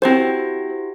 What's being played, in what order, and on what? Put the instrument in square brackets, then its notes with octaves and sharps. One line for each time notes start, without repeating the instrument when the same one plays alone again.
[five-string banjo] C4 C5 [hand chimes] E4 F#4 G4